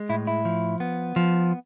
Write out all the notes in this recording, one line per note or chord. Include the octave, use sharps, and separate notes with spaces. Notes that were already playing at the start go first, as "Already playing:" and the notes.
Already playing: G#3
A2 E4
E4
F3
B3
F3